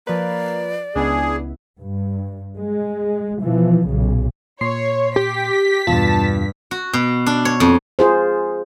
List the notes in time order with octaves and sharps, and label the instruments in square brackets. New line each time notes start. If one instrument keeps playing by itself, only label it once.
[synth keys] F3 B4 [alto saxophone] A#3 [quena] D5
[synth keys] C#2 B3 E4 [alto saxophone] D4 [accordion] G#4
[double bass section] G2
G#3
B2 E3 F3
B1 A#2 C#3
[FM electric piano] A#2 C6 C7 [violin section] C#5
[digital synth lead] G4 [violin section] B6
[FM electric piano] E2 B2 F4 [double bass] G2 [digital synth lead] A5
[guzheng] F#4
B2
D4
C#5
F2
[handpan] F4 G#4 C5